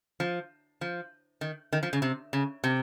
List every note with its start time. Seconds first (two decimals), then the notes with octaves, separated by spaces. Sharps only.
0.20 F3
0.81 F3
1.41 D#3
1.73 D#3
1.83 F3
1.93 C#3
2.02 C3
2.33 C#3
2.64 C3